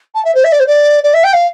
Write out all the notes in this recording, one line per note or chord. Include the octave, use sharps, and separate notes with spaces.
A5
E5
C5
E5
D5
C5
D5
D5
E5
G5
F5